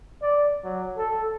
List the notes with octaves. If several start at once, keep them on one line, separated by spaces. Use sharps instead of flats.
D5
F#3
A4